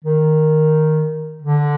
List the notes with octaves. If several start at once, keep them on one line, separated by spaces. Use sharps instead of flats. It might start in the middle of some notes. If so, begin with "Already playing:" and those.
D#3
D3